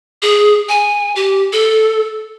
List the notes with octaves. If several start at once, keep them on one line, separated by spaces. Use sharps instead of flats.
G#4
G#5
G4
A4